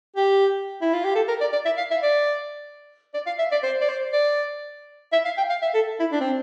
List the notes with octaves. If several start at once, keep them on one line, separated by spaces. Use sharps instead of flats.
G4
E4
F4
G4
A4
A#4
D5
D5
E5
F5
E5
D5
D5
F5
E5
D5
C5
D5
C5
D5
E5
F5
G5
F5
E5
A4
E4
D4
C4